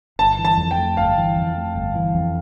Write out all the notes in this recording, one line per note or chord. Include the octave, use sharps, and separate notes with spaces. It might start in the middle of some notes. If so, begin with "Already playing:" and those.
G1 A5
E3
A5
F2
G5
A3
G1 F5
E3
F2
A3
G1
E3
F2